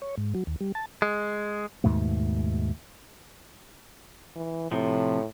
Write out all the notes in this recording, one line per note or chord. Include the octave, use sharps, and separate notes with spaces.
C#5
G#2
F#3
D#2
G3
A5
G#3
D#2 G#2 B2 A3
E3
A2 C3 F3